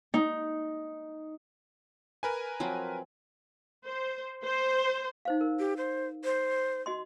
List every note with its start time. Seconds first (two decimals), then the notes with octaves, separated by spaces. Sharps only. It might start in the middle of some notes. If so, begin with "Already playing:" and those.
0.14 D#4
2.23 A#4 B4 G#5
2.60 F3 F#3 C4
3.84 C5
4.44 C5
5.25 D#4 C5 F5
5.41 A#4
5.59 G4
5.77 C5
6.24 C5
6.86 F#4 D#5 C6